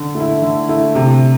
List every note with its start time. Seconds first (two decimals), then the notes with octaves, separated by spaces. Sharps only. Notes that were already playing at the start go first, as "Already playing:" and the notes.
Already playing: D3
0.15 A3
0.20 E4
0.42 D3
0.69 A3 E4
0.95 C3